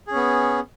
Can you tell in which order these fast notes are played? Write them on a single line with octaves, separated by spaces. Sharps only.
G#4 C#4 B3